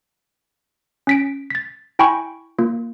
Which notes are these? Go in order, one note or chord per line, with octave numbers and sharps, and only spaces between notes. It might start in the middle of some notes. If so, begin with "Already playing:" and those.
C#4 B6 D7
A6 B6
E4 G5 G#5 B5 C#6
A#3 F4